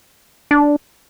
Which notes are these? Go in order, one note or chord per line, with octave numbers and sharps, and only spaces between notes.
D4